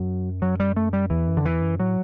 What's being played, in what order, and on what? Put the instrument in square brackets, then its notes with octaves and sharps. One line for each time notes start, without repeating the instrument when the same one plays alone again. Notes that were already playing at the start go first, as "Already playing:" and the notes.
Already playing: [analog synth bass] F#2 [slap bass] F#3
[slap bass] F#3
G3
A3
G3
[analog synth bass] E2 [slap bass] E3
[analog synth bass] F#2
[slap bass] D3
[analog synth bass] E2 [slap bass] E3
[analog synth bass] F#2
[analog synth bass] A2 [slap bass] F#3